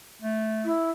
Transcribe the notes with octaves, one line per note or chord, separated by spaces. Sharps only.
A3
E4